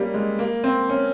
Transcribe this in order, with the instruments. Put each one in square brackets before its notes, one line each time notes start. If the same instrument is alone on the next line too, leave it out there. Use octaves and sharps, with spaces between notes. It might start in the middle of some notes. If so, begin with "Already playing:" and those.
Already playing: [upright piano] G3 A#3 C#4
G#3
A#3
C4
C#4